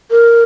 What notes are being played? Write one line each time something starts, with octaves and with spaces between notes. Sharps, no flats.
A#4